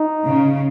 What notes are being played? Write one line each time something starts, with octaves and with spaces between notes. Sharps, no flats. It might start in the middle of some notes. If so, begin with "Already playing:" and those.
Already playing: D#4
C#3